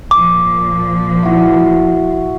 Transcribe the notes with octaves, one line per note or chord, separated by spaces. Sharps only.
A#2 F3 D6
E4 F#4